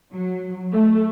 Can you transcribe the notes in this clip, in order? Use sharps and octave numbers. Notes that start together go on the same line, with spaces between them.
F#3
A3